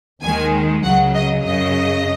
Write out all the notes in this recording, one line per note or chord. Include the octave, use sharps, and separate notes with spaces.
D#2 D#3 G#3 G#5
C#2 C#3 F#3 F#5
D#5
F#2 C#3 F#3 D#5